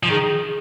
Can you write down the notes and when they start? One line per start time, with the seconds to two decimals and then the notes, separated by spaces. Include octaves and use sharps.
0.03 F3
0.09 D#3 G#4